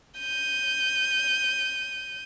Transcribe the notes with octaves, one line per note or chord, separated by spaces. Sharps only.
G6 D#7